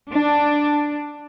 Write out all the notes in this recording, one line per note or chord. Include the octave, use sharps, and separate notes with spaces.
D4